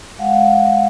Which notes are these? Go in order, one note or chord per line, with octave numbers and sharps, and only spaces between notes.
G#3 F5 F#5